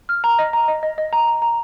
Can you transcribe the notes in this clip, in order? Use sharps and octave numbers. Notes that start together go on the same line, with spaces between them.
F6
A#5
D#5
A#5
D#5
D#5
D#5
A#5
A#5
A#5